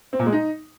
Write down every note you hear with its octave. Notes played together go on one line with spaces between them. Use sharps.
C4
A#2
G#3
D#4